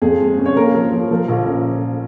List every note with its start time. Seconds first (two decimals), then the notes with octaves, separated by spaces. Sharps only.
0.02 F2 G#4
0.20 G#3
0.38 C#4
0.46 C#5
0.56 A#3 A#4
0.75 F3
0.92 F3
1.11 F3
1.28 A#1
1.46 C#4